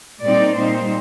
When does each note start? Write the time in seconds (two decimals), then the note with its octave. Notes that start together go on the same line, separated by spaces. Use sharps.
0.22 A#2 G3 C4 D#4 D5
0.56 A#2 G3 C4 D#4 C5